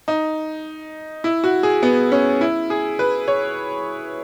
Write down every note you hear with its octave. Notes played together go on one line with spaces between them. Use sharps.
D#4
E4
F#4
G#4
B3
C#4
E4
G#4
B4
C#5